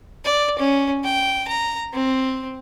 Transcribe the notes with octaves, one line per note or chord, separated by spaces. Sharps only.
D5
C#4
G5
A#5
C4